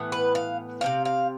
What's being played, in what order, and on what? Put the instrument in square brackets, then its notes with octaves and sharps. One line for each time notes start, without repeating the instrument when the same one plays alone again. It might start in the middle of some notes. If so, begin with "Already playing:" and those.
Already playing: [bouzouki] A2 E3 B3
B4
F5
C3 F3 C4 F5
F5